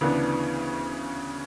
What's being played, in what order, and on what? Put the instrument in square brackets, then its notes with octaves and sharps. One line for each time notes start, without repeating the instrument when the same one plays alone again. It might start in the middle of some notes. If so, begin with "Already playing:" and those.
[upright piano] D2 C#3 E3 B3 D4